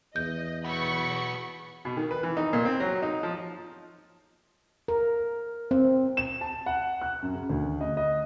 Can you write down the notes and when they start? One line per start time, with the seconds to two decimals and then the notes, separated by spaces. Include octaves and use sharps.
0.16 E2 D#5 G6
0.64 F#3 B3 B5 C#6
1.85 B2
1.97 D#3
2.11 B4
2.23 E3
2.37 D#4
2.53 A#2
2.65 C4
2.80 F#3
3.02 D#4
3.23 F3
4.88 A#4
5.71 C4
6.17 E7
6.41 A5
6.66 F#5
7.02 F#6
7.22 F#2
7.34 C#3
7.50 D2
7.81 D#5
7.97 D#5